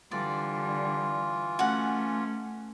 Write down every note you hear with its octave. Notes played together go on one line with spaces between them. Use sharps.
D3 E3 G3 F4 D5
A3 C#4 F#4 F#5